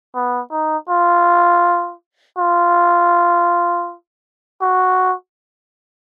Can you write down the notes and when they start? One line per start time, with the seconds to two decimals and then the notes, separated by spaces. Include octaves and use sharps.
0.15 B3
0.51 D#4
0.89 F4
2.38 F4
4.61 F#4